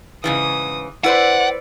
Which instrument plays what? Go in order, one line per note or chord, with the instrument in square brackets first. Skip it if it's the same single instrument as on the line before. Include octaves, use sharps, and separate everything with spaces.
[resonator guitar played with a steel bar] G#2 C#3 E3 [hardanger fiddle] D#6
[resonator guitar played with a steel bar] E4 B4 C5 [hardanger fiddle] D5 [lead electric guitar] F#5